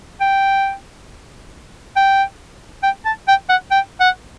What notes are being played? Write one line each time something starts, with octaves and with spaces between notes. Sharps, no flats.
G5
G5
G5
A5
G5
F#5
G5
F#5